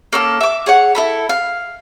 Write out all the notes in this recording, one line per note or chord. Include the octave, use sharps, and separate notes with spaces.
A#3 C#4 A4
E5 D6
G#4 C#5 F#5
E4 A4 B5
F5